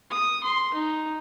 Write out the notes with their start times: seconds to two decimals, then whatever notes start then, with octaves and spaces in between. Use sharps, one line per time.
0.10 D#6
0.44 C6
0.74 D#4